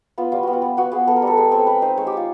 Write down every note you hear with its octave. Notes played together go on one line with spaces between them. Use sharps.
B3 F4
G3 F4
B3 F#4
F4
B3
B3 F#4
B3 G#4
B3 A4
A#4
G3 A4
G#3 G#4
C4 A4
G#3 B4
D#4 C5
G#3 C#5
G4
G#3 F4